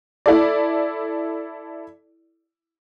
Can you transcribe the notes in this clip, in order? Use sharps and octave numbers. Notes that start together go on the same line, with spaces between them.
E4 A4 D5